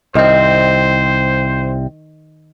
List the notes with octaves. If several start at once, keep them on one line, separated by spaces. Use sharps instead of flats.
C2 D#3 C4 C5